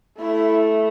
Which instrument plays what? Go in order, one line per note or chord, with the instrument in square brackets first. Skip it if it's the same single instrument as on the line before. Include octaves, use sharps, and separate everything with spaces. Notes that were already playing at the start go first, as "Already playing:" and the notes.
[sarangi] A3 [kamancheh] E4